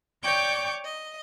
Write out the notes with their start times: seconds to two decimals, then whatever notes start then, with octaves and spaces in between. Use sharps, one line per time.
0.24 C#5 D5 G5 C#6 D6 G6
0.85 D#5